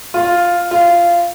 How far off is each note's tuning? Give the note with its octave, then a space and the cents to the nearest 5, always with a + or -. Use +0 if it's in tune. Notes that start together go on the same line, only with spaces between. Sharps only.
F4 +0
F4 -15